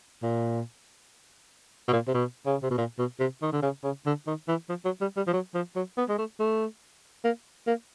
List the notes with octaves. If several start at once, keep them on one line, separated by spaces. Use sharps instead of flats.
A#2
B2
A#2
C3
B2
C#3
C3
B2
A#2
B2
C3
D#3
D3
C#3
C#3
D3
D#3
E3
F3
F#3
G3
G3
F3
F#3
F3
F#3
B3
G#3
A3
A3
A#3
A#3